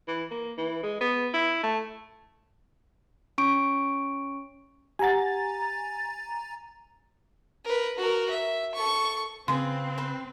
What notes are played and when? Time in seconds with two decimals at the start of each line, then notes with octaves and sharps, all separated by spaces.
0.08 E3
0.31 A#3
0.58 E3
0.83 G#3
1.01 B3
1.33 E4
1.63 A3
3.38 C#4 C#6 D7
4.99 G4 F#5 G#5 A#5 A6
7.64 A#4 B4
7.98 F#4 A#4
8.30 E5
8.74 A4 C#6
9.48 C#3 C4 F4 G#4 B4 C6
9.98 B4 C5